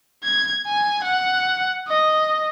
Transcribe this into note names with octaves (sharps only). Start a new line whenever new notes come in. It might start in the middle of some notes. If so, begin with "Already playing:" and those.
G#6
G#5
F#5
D#5